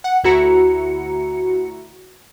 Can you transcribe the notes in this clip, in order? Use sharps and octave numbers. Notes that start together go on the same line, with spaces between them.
F#5
D2 E4 F#4 A#5 C#7